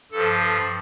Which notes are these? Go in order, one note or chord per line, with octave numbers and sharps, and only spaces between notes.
G2 F3 A4